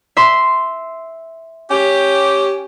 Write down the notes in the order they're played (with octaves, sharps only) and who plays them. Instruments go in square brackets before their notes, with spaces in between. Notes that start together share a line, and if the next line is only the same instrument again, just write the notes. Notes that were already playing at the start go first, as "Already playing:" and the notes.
[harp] E5 C6
[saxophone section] C#4 G4